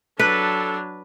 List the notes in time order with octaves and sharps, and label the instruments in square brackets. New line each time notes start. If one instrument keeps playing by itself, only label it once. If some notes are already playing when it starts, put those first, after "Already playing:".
[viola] F#3 D4 [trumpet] A4 [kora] B4